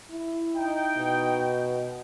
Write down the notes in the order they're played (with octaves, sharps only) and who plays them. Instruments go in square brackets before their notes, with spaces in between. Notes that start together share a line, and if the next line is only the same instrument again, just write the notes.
[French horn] E4
[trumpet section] D#4 G5
[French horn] B2